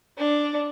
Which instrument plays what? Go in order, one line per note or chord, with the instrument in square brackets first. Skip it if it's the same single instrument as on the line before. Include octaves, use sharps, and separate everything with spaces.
[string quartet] D4